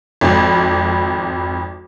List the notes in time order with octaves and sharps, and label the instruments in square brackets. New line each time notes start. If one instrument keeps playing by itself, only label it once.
[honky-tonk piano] G#1 F2